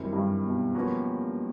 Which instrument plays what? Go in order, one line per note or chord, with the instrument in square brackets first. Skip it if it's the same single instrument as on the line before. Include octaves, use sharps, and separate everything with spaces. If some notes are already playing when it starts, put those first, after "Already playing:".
Already playing: [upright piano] F#2 [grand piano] D#3 G3 C4 E4
[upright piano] G2
B2
[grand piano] F3 A#3 C#4 F#4 B4